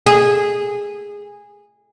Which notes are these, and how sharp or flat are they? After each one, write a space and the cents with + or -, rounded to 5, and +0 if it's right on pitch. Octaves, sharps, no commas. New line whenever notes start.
G#4 -15